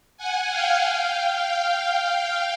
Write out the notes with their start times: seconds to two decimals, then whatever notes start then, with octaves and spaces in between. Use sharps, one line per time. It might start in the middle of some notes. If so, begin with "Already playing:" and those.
0.17 F#5 G#5
0.50 F5 G5
1.48 F5 G5